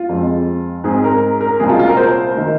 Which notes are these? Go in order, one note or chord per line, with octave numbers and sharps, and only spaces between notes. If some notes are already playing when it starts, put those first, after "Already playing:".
Already playing: F4
F2 F3 G#3 C4
G#2 G#3 C4 G#4
A#4
A#4
C2 A#2 G#3 C4 G#4
F4
F4
A#4
C5
D#3 A#3